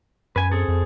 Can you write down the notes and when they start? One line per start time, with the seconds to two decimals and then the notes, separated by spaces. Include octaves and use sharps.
0.36 F#2 B4 G#5
0.52 C4 G#4 A4
0.68 F2